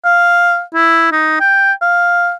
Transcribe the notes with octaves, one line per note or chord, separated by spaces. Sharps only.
F5
E4
D#4
G5
F5